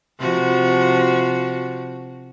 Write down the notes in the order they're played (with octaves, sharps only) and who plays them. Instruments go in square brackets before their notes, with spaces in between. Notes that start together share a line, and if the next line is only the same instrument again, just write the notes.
[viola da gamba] C3 F3 F#4